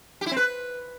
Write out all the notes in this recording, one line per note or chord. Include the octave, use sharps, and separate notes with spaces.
G4
E4
C4
B4